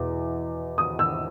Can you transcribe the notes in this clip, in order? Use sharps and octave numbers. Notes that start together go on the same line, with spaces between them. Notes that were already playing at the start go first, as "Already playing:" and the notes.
Already playing: E2 B2
D#6
E6